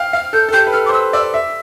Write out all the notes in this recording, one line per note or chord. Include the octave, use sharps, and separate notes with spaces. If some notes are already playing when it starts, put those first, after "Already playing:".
Already playing: F5 G5
F5 F6
A4 G6
A4
G4 G6
B4
A4 F6
D6
C5
B4 E6
D5 E6
E5